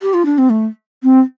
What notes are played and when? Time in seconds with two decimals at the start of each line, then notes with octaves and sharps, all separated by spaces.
0.02 G4
0.14 F4
0.26 D4
0.38 C4
0.50 A3
1.03 C4